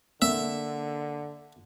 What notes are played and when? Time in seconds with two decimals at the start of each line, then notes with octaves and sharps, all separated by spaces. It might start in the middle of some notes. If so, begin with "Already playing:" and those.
0.22 D3 A#3 E5